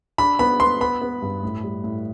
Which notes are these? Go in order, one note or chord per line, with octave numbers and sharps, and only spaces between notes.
D4 B5
B3 B5
B3 C6
B3 B5
B3
G2
A2
G3
A2